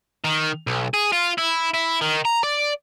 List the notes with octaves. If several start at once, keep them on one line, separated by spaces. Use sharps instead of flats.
D#3
B1
G#4
F4
E4
E4
D#3
A#5
D5